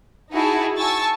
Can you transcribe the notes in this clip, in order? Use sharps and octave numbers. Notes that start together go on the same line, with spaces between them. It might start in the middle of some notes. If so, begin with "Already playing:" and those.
D#4 E4 F#4 G#4 A5
G#5 A5 C#6 E6 A6